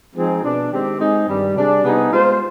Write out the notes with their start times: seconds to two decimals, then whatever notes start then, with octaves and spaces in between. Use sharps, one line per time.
0.15 F3 G#3 C4 D#4 G#4
0.43 B2 B3 D4
0.72 D#3 G#3 C4 G4
0.99 G#3 C4 D#4 G#4
1.27 G2 D#3 G3
1.55 C3 G3 D4 G#4
1.83 C3 G3 B3 D#4 G#4
2.12 G#3 B3 F4 C5